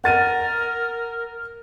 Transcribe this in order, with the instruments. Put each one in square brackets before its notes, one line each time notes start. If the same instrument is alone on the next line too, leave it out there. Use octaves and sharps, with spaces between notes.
[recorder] A#4 [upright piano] F#5 A6 D#7